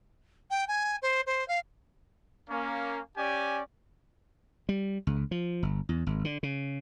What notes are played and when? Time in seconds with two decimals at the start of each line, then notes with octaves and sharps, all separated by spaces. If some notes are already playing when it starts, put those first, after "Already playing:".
0.50 G5
0.68 G#5
1.02 C5
1.26 C5
1.48 F5
2.50 A#3 C#4
3.17 C#4 G4 D5 G#5
4.69 G3
5.07 C#2
5.31 F3
5.63 G1
5.89 E2
6.07 G#1
6.25 D3
6.43 C#3